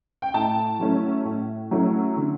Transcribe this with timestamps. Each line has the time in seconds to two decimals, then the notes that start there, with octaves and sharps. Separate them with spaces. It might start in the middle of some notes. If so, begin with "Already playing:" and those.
0.22 G5
0.34 A2 A5
0.79 F#3 A3 C#4 E4
1.25 A2
1.71 F#3 A3 C#4 E4
2.17 D3